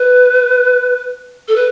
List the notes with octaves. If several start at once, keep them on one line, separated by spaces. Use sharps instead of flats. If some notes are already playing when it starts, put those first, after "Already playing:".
Already playing: B4
A4
B4